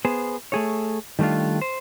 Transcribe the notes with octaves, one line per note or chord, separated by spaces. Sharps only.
B3 G#4 C5
A3 G#4 C#5
D#3 G3 A3 D4 F4
C5